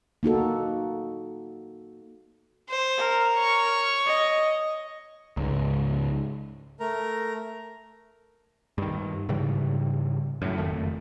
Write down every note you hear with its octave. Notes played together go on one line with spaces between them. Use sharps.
A#3 D#4 F#4 A4
C5
A#4
C#5 C#6
D#5
C#2 G#2
A3 A#4 A#5
G2 D#3
G#2 C#3 E3 G3
F#2 A2
F#1 F2 D#3 A3